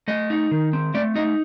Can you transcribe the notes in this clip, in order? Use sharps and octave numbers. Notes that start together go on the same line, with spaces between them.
A3 D#5
D#4
D#3
C4
A3 D5
D#4 D#5